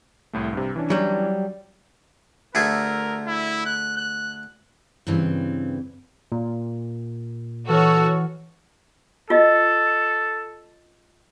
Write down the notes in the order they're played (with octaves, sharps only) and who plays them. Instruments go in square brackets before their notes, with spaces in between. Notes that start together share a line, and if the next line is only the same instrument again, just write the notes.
[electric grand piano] C2 A2 A3
G2 C3
E3 C#4 D4
[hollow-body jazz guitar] F#3 G3
[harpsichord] D2 A3 G#4 [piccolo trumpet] A#4
[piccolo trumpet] E4
F#6
F#6
[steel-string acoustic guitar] G2 C#3 E3 C4
[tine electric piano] A#2
[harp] E3 F6 [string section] F#4 C#5 [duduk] A4
[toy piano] F4 D#5 [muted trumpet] A4